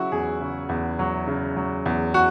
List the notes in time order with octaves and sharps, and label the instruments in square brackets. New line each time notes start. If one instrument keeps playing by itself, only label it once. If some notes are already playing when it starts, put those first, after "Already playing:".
Already playing: [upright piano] C#3 F#3 E4 F#4
E2 G#4
C#3
E2
F#3
C#3
F#3
E2
F#4